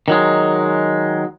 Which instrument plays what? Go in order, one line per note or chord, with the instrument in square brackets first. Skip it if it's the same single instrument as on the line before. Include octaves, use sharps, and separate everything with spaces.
[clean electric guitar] D#3 F#3 G#3